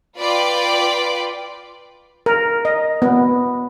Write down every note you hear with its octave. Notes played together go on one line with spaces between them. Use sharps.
F4 B4 D5 G5 B5 D6
A#4
D#5
B3